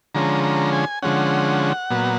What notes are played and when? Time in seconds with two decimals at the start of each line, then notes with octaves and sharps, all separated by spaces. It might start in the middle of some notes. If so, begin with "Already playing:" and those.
0.15 D3 F3 G#3 C#4 A#5
0.44 A#5
0.73 G#5
1.02 D3 F3 G#3 C#4 F#5
1.90 A#2 F#3 B3